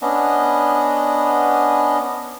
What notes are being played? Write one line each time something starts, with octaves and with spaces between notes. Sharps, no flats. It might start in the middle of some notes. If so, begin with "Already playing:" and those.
B3 C#4 D4 D#5